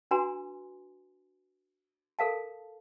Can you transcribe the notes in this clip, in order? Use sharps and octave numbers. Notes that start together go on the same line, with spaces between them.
D4 F#4 B4 G#5 A#5 C6
A4 A#4 F5 A5